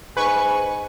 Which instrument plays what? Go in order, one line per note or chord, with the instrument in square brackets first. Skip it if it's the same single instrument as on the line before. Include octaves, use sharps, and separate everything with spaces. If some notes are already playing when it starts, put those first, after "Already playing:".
[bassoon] G#2 [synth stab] B4 C#6 [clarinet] G#5